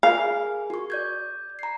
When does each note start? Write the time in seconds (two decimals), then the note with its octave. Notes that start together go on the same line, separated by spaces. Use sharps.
0.03 G#4 A#4 F5 G#5
0.70 F#4 C#6
0.90 D5 G6 G#6
1.59 A#5 C7